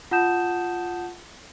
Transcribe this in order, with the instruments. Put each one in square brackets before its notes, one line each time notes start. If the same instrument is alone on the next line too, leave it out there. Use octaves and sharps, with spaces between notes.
[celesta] F4 F#5 A5 D#6 G6 E7